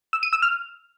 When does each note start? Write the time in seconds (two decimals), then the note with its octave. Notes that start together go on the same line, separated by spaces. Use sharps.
0.13 E6
0.23 D#7
0.33 E6
0.42 F6